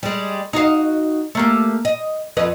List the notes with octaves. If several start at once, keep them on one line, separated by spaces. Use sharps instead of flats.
G3 G#3
D#4 F#4 F5
A3 A#3 G4
D#5
F2 B4 D#5